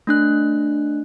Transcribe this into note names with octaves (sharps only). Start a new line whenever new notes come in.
A3 D4 F#6